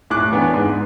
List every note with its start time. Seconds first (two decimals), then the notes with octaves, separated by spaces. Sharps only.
0.10 A2 D6 F#6
0.32 E3 B3 D4
0.54 G#2